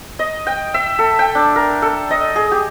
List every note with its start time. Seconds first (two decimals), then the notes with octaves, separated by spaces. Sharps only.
0.19 D#5
0.47 G5
0.74 E5
0.99 A4
1.19 G5
1.35 D4
1.56 A#4
1.82 A4
2.11 D#5
2.36 G#4
2.52 G4